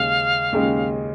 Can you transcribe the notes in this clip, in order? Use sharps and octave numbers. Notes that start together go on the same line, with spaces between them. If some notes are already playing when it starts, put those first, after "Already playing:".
Already playing: D#2 C#3 G#3 F5
D#2 C#3 G#3